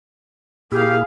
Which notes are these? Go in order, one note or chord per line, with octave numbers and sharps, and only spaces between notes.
A#2 A#3 E4 G4 G#4 F5